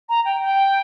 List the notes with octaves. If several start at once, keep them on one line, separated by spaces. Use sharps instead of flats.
A#5
G5
G5